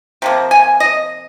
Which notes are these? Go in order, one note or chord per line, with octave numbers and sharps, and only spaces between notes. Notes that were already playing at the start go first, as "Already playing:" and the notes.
C3 F3 A#3
G#5
D#5